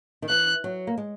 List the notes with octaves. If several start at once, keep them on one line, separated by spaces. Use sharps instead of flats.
D#3
E3 F#6
F#3
A#3
G#3